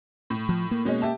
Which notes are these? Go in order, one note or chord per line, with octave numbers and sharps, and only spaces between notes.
A2
F3
A#3
B2 G#3 C#4
G4 E5 A5